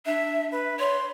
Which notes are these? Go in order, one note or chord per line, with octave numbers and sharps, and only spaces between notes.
D4 E5
B4
C#5 C6